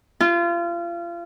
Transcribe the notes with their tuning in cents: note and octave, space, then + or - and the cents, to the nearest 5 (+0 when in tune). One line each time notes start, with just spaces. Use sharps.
F4 -30